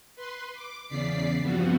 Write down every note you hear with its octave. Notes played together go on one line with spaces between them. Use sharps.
B4 C6
D6
E2 C#3 D5 B6 C7
G2 F3 G3 B3 C4 F#4